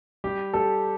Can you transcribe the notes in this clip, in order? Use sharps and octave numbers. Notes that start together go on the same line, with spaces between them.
G3 G4
G3 A4